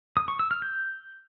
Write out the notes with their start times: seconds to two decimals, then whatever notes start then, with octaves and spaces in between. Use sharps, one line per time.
0.17 D#6
0.28 C#6
0.39 E6
0.51 F6
0.62 G6